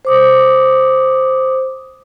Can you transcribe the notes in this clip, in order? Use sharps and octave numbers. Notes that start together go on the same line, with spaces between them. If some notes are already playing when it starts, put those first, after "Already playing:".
C5 D6 D#6